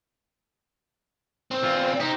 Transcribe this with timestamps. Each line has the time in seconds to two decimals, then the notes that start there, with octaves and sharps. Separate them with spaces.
1.51 C4
1.63 E2 F4
2.00 D#4 G4 C5